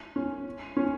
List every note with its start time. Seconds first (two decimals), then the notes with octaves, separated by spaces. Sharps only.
0.16 C#4
0.77 C#4